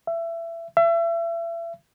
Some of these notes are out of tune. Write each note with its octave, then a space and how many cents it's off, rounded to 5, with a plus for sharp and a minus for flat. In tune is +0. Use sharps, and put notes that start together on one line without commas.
E5 +25
E5 +35